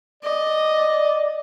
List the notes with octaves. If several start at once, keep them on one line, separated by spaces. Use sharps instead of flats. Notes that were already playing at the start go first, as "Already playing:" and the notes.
D5 D#5